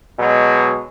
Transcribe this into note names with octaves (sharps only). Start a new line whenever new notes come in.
B2 F#3 G#3